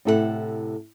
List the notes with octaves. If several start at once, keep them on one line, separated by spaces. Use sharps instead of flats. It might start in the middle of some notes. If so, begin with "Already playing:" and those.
A2 C3 E4 A4 B4 F#5